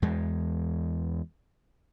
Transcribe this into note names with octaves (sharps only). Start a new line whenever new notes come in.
E2 G#3